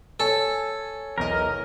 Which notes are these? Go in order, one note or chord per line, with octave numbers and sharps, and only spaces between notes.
A4 C#5 G#5
B1 E2 A#4 D#5